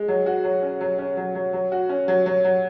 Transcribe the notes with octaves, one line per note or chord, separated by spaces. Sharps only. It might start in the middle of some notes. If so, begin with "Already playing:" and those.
Already playing: G#3
F#3
F#4
F#3
C#4
F#3
C#4
F#3
F#3
F#3
F#4
C#4
F#3
F#3
F#3